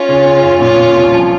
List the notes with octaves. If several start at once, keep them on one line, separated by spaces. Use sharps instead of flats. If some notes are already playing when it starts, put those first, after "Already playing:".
Already playing: C#4 F4
C#3
C#3
F#2
A#2 C#4 F4
A#2
C2
F3